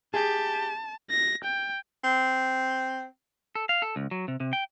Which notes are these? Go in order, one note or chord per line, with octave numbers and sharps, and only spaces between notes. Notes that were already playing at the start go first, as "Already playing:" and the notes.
G4 G#4 A5
A#6
G5
C4
A4
F5
A4
C#2
F#3
C3
C3
G5